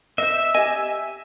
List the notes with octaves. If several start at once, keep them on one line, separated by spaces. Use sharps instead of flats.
C5 D#5 E5
G4 D#5 G#5